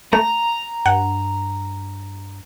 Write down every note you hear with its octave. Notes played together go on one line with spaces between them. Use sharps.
A3 A#5
G2 F#5